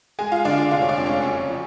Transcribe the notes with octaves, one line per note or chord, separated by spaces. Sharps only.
G#3 G#4 G#5
F4 F5
D3 D4 D5
F4 F5
F1 F4 F5
C#5
D4 D5
F2
C#4 C#5
F#1
F3